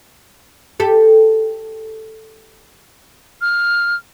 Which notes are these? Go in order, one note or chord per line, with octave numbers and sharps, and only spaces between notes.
G4 A4
F6